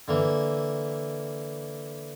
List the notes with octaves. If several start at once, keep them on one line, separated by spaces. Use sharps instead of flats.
D3 E3 A#3